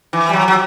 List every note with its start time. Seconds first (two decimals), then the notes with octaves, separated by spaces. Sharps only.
0.13 E3
0.29 G3
0.33 F#3
0.48 F#3